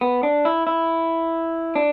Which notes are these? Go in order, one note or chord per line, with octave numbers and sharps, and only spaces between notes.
B3
D4
E4
E4
D4